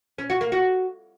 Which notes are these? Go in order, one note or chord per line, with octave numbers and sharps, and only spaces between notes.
C#4
F#4
A#3
F#4